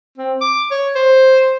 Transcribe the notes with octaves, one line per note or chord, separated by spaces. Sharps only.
C4
D6
C#5
C5